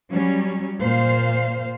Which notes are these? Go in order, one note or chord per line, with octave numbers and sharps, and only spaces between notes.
F#3 G3 C#4
A#2 C5 F5